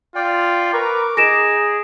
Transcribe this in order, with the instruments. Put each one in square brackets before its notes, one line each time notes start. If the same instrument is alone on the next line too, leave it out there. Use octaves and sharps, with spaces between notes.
[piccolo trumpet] F4 [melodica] D5 G5
[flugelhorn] A#4 [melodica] B4 A#5 C#6 [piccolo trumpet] D6
[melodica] D#4 [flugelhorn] G#4 [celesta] A#6 D7 E7